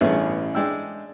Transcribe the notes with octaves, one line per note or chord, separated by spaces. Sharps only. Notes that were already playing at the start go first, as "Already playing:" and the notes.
A1 G2 B3 C#4 E4 G#4
G#3 D4 G5 E6